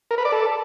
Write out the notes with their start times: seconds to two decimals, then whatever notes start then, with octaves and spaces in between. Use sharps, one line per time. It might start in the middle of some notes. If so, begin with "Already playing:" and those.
0.11 A#4
0.18 B4
0.25 D5
0.32 A4